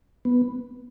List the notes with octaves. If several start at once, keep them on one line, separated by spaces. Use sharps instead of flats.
B3